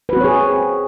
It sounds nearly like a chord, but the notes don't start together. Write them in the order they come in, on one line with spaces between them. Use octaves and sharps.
B4 F#4 C4 C#5 G#4